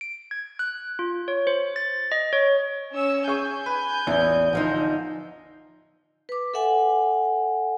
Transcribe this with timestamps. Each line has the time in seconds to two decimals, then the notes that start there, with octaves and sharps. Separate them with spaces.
0.01 D7
0.31 G#6
0.59 F#6
0.99 F4
1.28 C#5
1.47 C5
1.76 A6
2.12 D#5
2.33 C#5
2.90 C#4 C#5 E6
3.28 G#4 G#5 C#6 G6
3.66 B4
4.07 A1 E2
4.53 D3 F3 D#4
6.29 B4 D6
6.54 A4 E5 F#5 G#5